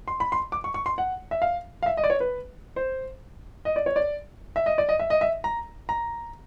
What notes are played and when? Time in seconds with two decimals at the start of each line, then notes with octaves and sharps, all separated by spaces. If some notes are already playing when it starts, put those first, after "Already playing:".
0.08 C6
0.20 B5
0.32 C6
0.52 D6
0.64 C#6
0.74 C#6
0.86 C6
0.98 F#5
1.31 E5
1.42 F5
1.83 F5
1.86 E5
1.97 D#5
2.04 D5
2.10 C#5
2.20 B4
2.76 C5
3.65 D#5
3.76 D5
3.86 C#5
3.96 D5
4.56 E5
4.66 D#5
4.78 D5
4.89 D#5
5.00 E5
5.10 D#5
5.21 E5
5.44 A#5
5.89 A#5